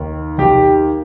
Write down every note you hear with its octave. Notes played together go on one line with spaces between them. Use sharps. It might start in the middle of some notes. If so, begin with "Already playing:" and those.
Already playing: D#2 D#3
D#2 D#3 G4